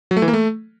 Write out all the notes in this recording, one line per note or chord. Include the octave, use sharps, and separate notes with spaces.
F#3
A3
E3
A#3
A3